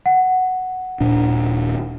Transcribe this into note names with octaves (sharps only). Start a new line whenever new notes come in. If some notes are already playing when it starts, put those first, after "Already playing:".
F#5
D#1 A#2 D4